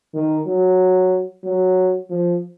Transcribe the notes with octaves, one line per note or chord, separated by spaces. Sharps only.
D#3
F#3
F#3
F3